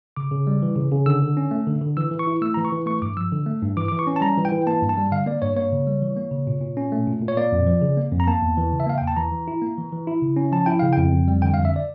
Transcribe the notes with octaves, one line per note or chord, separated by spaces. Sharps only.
C#3 D6
C#3
G3
E3
C#3
C#3
D3 E6
D3
C#4
A3
D3
D3
E3 E6
E3
C#6
E4
A3 E6
E3 A#5
C#6
E3
A3 C#6
G2 D6
F3 E6
D3
A3
G2
E3 D6
D6
E3
C#6
C#4
A5
G3 A#5
E3
G5
E3
A#3 A5
G2
A5
G3
D3 F5
A#3 D5
G2 C#5
A#3 C#5
C#3
G3
E3
A#3
C#3
A#2
A#2
C#4
A3
A#2
A#2
C#5
A#3 D5
F2
F3
C#3
A#3
F2
A#5
A#3 A5
E2
E3
C#3
E5
A#3 F5
E2 G5
A5
E3 A#5
E3
E4
A#3
E3
E3
E4
C#3
C#4
F3 A5
E4 G5
C#3 F5
F2 G5
F2
G3
D3 G5
F5
F2
E5
D5